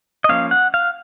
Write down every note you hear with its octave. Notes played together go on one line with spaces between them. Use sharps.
D#5
F3 A#3 C#4 F5
F#5
F5